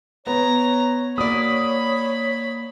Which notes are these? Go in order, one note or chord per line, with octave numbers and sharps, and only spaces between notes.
B3 C#5 A#5
A#3 F#4 D5 B5 D#6